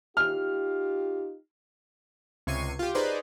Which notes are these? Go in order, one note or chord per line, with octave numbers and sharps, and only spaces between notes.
D#4 F4 G4 F6
C#2 C3 C#6 G#6 C7 D#7
F4 G4
D#4 G#4 B4 C5 D5